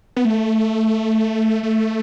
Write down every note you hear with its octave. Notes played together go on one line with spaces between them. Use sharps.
B3
A3
A3